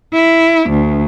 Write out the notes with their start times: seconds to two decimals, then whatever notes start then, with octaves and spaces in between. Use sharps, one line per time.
0.13 E4
0.70 D2